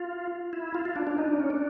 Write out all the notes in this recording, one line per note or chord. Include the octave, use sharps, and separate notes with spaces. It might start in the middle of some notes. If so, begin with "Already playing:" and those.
Already playing: F4
E4
F4
F4
D4
D4
D#4
D4
C#4
D4